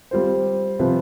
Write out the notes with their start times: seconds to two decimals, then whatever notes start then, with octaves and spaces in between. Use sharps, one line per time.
0.11 G3 C4 F4 C5
0.79 C3 F3 C4 F4 B4